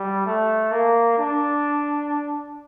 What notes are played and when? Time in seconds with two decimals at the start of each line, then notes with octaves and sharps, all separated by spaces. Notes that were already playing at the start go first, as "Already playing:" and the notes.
Already playing: G3
0.26 A3
0.71 A#3
1.18 D4